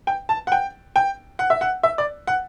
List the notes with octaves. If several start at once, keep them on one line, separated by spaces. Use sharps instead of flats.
G5
A5
F#5
G5
G5
F#5
E5
F#5
E5
D5
F#5